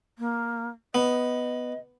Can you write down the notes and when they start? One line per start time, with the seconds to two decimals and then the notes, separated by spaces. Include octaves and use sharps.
0.18 A#3
0.95 B3 D#5